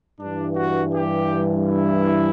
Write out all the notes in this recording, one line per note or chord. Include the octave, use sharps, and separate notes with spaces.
G2 E3 D4
F#4
G4
E4